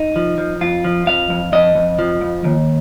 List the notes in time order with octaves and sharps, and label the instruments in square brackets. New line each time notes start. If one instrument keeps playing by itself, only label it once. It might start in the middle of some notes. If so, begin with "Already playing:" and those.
Already playing: [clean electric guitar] D#4
F3
F3
F2 F4
F3
F2 F5
F2
F2 D#5
F2
F3
F2
D#2